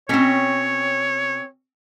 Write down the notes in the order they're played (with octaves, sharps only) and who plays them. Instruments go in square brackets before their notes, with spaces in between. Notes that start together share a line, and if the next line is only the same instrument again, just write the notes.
[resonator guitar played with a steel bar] B2 C#4 [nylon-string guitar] C4 G5 [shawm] C#5